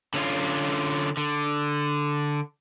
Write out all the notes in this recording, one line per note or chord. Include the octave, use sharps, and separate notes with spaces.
D3 C#4 F4
D3